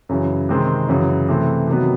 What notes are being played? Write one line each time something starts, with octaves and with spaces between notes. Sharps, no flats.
F#2 C#3 E3
C3 D#3 G#3 C4
F#2 C#3 E3
C3 E3 A3 C4
C3 D#3 F#3 B3